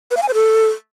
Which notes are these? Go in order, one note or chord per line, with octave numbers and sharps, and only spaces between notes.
B4
F5
G#5
C5
A4